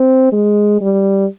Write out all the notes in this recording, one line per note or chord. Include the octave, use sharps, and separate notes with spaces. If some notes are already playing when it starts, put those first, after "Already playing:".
Already playing: C4
G#3
G3